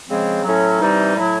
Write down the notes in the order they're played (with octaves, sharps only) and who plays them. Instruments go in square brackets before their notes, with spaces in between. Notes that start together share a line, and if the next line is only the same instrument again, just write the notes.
[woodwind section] C#3 F3 G#3 C4
A2 F#3 C#4
C3 E3 G3 D#4
A2 F#3 E4